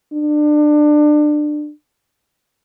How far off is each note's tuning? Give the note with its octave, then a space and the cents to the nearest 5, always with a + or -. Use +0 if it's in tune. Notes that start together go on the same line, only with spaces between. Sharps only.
D4 +25